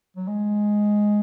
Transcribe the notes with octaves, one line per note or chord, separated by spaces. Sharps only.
F#3
G#3